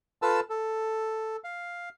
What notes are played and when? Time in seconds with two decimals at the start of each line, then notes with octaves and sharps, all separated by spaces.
0.22 F4 A4 B4 A5 E6
0.50 A4
1.44 F5